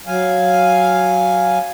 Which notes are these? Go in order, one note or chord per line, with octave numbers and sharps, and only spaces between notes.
F#3 F5 G#5